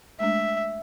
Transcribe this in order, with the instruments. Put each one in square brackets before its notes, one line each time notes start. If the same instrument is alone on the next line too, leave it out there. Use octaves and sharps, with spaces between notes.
[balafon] G#3 A3 D4 [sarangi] E5